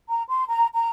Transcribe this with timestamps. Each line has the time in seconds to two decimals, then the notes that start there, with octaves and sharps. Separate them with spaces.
0.09 A#5
0.29 C6
0.49 A#5
0.75 A#5